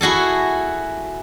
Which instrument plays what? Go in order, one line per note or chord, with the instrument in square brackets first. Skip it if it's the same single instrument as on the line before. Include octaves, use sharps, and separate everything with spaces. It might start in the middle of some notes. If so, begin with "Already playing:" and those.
[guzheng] E4 F#4 G#4 A4